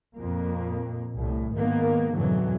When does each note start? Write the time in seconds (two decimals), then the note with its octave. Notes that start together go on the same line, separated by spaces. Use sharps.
0.17 F2 A#2 A#3
1.15 C2 A2
1.54 G#2 D#3 A#3 B3
2.14 F2 G#2 B2 D3 E3 F#3